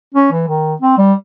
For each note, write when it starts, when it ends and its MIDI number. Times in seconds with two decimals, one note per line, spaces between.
0.14 0.27 61
0.32 0.46 52
0.48 0.74 51
0.82 0.93 60
0.98 1.13 55